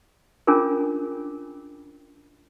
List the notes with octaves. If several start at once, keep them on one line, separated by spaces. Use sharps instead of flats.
C#4 D4 F4 G#4 A#4